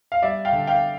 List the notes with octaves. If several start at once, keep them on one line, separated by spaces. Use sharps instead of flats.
F5
G3 D5 E5
F5 G5
D3
F5 G5